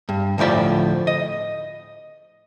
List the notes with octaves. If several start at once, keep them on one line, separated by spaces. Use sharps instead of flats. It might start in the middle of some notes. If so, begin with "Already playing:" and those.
G2
D2 A2 F3 D5 B5
D#5